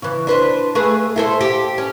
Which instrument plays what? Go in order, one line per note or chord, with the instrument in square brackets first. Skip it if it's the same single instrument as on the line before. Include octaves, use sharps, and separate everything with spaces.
[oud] C#3 E3
D4 B4 C5
A3 G#4 B4
E4 A4 C5
G4
C#4